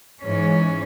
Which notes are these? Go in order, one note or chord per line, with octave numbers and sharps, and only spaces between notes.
G#2 E3 G#3 C#4